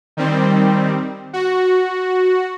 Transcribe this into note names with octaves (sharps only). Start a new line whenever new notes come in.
D#3 G3 C4
F#4